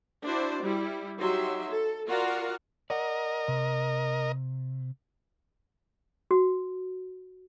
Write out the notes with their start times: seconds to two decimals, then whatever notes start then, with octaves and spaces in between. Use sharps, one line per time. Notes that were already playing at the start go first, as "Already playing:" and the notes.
0.23 D4 E4 F#4 C5 D5
0.62 G3 E4
1.19 F#3 D#4 G4 E5 C6
1.69 A4
2.06 F4 F#4 A#4 D5 F5 F#5
2.90 A#4 D5 D#5 F#5
3.48 C3
6.31 F#4